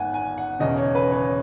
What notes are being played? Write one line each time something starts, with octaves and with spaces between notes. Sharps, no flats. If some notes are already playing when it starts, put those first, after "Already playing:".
Already playing: G#1 D#3 F#5 G#5
G#5
F#5
E1 E2 C#3 D#5
C#5
B4
C#5